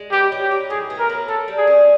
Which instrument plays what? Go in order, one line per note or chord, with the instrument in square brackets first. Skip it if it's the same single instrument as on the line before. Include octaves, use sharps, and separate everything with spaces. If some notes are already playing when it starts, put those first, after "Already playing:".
Already playing: [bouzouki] G#3
[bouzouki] B3 [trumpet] G4
[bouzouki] F#3
[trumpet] G4
[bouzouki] D#4
[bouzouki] A2 [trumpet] G#4
[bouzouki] B3
[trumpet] A#4
[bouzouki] F#3
[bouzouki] A#3 [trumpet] A4
[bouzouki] G3
[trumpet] G#4
[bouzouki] C#4